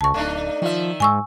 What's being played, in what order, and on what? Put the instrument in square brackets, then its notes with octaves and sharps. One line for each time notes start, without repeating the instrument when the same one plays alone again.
[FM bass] C#2 [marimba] A5 C#6
[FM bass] D1 [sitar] A3 D4 D#4
[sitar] D#3 E5 [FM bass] F3
[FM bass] G#2 [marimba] G#5 C#6 E6